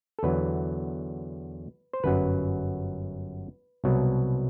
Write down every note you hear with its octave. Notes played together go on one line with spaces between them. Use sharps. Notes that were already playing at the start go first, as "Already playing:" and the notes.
A4
E2 D3 F#3 B4
C5
G1 F#2 F#3 B4
C2 B2 F#3